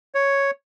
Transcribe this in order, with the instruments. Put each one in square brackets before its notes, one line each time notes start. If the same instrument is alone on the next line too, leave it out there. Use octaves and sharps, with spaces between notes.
[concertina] C#5